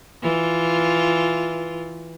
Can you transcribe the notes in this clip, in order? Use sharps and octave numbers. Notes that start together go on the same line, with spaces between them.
E3 F4